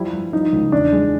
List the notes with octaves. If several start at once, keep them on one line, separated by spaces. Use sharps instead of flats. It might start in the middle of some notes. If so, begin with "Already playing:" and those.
Already playing: F3 G3 E4
G2
F3 D#4
C#2
E2 D4
G#3